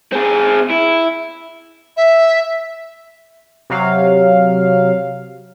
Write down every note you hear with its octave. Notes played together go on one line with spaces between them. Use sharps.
C4 G#4
E4
E5
C3 F#3 F5